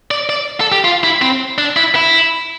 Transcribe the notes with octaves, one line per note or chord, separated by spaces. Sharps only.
D5
D5
A4
G4
F4
E4
C4
D4
E4
E4